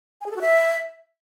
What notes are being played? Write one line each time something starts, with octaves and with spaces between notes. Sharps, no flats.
G#5
G#4
A4
F#4
E5